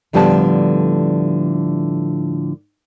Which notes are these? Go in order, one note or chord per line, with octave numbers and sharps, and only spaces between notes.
A2 D3 F3 G3 B3 A5